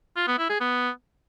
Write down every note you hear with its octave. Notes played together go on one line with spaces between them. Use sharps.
F4
B3
E4
G#4
B3